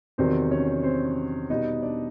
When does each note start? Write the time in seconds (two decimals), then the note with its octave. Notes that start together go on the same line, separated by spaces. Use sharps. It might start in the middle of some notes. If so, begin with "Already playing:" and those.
0.18 E2 C3 D#3 F#3 C4 C5
0.51 C#4 C#5
0.83 C4 C5
1.50 B2 G3 B3 D#4 D#5
1.82 D4 D5